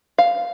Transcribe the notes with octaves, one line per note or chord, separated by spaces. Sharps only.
F5